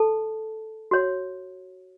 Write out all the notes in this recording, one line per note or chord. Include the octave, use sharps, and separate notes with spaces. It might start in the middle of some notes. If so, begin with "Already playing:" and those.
Already playing: A4 A5
F#4 C#5